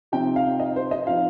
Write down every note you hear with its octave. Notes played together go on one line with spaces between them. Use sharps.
C3 F3 C4 D#4 G5
F5
D#5
C5
D#5
F3 C4 D#4 F5